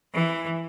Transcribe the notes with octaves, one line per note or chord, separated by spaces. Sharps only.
E3